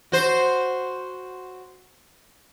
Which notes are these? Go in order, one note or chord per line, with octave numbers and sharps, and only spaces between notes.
F#4 C5